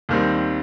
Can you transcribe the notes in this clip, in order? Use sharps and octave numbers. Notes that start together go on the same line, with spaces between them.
D#2 D#3 G3 C4